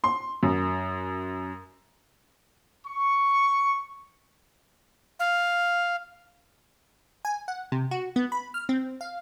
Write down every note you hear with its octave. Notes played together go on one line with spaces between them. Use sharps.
C6
F#2
C#6
F5
G#5
F#5
C3
F#4
B3
B5
F6
C4
F5